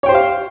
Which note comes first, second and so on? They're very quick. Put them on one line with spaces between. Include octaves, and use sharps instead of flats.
C#5 G5 C5 G4 F5